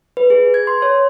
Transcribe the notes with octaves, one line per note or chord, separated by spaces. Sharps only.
B4
G#4
G#6
C6
C#5